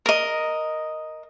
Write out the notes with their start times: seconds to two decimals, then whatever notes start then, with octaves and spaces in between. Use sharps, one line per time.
0.06 A#4 D#5